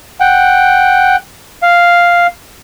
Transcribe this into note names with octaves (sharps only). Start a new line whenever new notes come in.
F#5 G5
F5